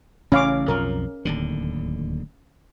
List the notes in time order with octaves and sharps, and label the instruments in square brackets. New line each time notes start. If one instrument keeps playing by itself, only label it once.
[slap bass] A1 C#3 [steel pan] C#4 F5 D6
[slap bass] B1 F2 F3 [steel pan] A#4
[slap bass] D1 D#2 D3